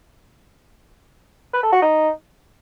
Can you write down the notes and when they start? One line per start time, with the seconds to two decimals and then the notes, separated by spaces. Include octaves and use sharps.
1.54 B4
1.63 A4
1.72 F#4
1.82 D#4